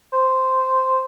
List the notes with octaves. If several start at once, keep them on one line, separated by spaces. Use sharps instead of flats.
C5